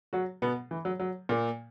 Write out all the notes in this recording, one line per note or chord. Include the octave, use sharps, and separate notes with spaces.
F#3 F#4
B2 B3
E3
F#3
F#3
A#2 A#3